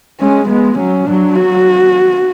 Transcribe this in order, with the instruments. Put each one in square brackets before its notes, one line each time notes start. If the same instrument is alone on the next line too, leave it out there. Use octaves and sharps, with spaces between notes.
[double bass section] G#3 [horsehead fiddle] C#4
[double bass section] G#3 [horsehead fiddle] B3
[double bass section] F#3 [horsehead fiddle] C#4
[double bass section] F#3 [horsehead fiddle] D4
[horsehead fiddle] F#4